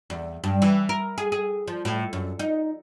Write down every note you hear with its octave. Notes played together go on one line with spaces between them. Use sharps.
E2
G2
E3
A#4
G#4
G#4
F3
A2
F#2
D#4